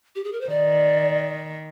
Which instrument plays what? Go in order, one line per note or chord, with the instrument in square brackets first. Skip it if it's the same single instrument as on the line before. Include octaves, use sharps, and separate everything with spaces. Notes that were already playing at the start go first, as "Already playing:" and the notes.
[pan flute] G4
G#4
A#4
C5
[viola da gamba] D#3 [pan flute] D5